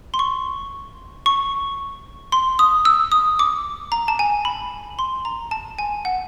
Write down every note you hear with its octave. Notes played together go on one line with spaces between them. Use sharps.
C6
C#6
C#6
C6
D#6
E6
D#6
D6
A#5
A5
G#5
B5
C6
A#5
A5
G#5
F#5